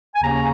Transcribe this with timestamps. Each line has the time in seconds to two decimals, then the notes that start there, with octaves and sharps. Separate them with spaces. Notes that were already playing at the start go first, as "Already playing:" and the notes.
0.15 G#5
0.22 D#2 C#3 A#3 C#4 A#5